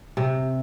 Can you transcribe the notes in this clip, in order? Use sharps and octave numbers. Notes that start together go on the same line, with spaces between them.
C3